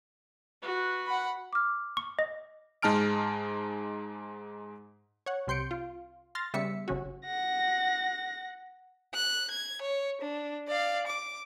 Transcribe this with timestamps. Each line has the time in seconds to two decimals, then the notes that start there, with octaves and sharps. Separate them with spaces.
0.62 F#4 B4
1.06 F#5 B5
1.53 D6 F6
1.97 C#6
2.19 D#5
2.82 G#2 G#3 D#4 A5 F6 D7
5.26 C#5 F#5
5.47 C2 C3 C6 G6 C#7 D7
5.71 F4
6.35 C6 F6 A6 A#6
6.54 C#3 G3 B3 E5 B6 C#7
6.88 G1 C#3 C#4 F#4
7.25 F#5 A#6
9.14 F#6
9.50 G#6
9.81 C#5
10.21 D4
10.68 D5 F5
11.07 D6